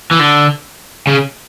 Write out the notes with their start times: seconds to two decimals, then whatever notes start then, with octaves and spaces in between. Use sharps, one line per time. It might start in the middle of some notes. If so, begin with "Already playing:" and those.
0.11 E3
0.20 D3
1.07 C#3